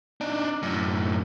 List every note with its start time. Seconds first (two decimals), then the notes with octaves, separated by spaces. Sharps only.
0.21 D4 D#4
0.63 F#2 A2